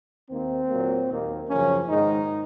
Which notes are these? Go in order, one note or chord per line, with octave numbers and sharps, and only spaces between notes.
D#2 D#3 A#3 C4
A#2 F#3 A#3
D#2 D#3 A#3
F#2 C#3 F3 A#3 C#4
G#2 D#3 G#3 D#4